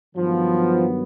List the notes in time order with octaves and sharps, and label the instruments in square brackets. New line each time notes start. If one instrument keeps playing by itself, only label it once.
[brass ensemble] G2 D#3 F#3 B3 [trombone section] F3